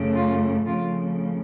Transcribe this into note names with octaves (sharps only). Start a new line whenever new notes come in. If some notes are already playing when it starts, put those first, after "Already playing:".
Already playing: F#2 C#3 A3
F4
F2 C#3 F3 A3 F4